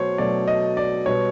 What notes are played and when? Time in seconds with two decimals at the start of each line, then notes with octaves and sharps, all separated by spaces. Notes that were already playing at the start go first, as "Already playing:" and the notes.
Already playing: B2 F#3 A3 C5 C#5
0.18 B2 F#3 A3 D5
0.48 D#5
0.77 D5
1.06 B2 G3 B3 C#5